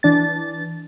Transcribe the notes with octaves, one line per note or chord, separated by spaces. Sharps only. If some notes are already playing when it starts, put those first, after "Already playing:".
E3 D4 A6